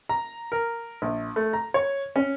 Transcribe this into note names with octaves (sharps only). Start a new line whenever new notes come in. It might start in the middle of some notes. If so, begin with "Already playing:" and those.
A#5
A#4
A#1
A3
A#5
C#5
C#4